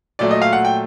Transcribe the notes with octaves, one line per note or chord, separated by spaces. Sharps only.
A#2 F#3 A3 D5
D#5
F5
F#5
G5